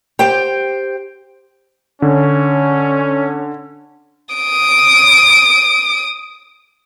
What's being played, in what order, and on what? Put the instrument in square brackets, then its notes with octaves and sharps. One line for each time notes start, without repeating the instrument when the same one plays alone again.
[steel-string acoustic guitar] G4 C5 G5
[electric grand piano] D3 [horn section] C#4
[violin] D#6 D7